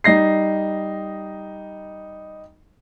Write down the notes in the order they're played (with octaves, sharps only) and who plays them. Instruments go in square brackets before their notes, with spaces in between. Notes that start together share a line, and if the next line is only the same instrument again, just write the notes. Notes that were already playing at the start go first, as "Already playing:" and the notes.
[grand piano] G3 D#4 A#6 C7